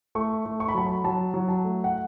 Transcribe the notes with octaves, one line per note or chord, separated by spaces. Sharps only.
A3 C#6
A3
C#6
B5
F#3 A5
B5
F#3 A5
F#3
A5
A3
F#5